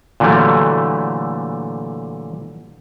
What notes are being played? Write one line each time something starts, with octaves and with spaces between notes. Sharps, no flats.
A#2 D3 E3 F#3 G3 A3